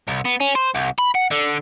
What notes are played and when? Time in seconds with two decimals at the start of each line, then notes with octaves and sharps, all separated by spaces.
0.08 C2
0.25 B3
0.40 C#4
0.55 C5
0.74 C2
0.99 B5
1.15 F#5
1.31 D3